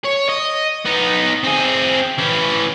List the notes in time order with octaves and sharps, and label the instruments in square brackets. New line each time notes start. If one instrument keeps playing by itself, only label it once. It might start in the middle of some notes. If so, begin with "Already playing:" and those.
[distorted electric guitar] C#5
D#5
B3 D#4
C4 G#4
E3 C#4